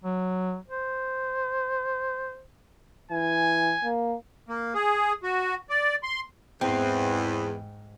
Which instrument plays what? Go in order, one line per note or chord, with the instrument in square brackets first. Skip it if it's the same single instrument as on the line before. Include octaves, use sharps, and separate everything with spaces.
[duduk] F#3
C5
[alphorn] E3 [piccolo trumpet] G#5
[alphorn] A#3
[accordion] A#3
G#4
F#4
D5
C6
[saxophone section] E2 [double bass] G#2 [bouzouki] C4